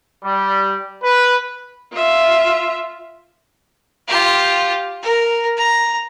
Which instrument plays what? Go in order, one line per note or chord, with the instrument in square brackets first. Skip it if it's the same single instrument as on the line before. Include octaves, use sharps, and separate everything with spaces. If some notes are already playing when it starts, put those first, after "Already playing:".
[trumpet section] G3
B4
[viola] F4 E5
[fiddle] F4 G4
A#4
A#5